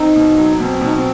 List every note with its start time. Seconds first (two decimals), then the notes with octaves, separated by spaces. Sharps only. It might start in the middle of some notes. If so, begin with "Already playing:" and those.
Already playing: C4 D#4
0.16 B2
0.38 F#3
0.60 B2 C4
0.81 B2 D#4
0.92 C4